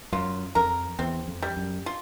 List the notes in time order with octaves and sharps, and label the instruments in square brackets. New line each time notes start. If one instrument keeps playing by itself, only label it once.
[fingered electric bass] F#2 [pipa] F4
[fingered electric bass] F2 [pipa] A#4
[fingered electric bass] E2 [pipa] C4
[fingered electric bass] F2
[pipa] G3
[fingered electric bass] F#2
[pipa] F4